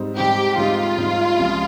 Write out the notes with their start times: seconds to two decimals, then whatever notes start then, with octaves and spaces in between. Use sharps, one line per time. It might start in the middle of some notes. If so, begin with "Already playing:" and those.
Already playing: G#2 G3 C4 D#4
0.16 G#2 G3 C4 D#4 G4
0.57 G#2 G3 C4 D#4 F4
0.98 G#2 G3 C4 D#4
1.38 C2 C3 F3 G#3 C#4